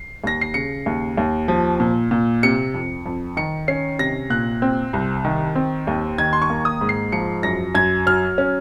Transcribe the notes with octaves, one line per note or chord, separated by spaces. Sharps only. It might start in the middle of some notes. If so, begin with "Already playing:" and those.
Already playing: C7
D#2 A#6
C7
C#3 C#7
D#2
D#2
F3
A#2
A#2
C3 C#7
F2
F2
D#3 C#7
C#4 C7
C3 A#6
A#2 F#6
C4
C2
D#3
C4
D#2
D#3 G#6
C6
C#6
A#3
D#6
G#2
C7
F3 C#7
F#2 A#6
F#2 G#6
F#3 F6
C#4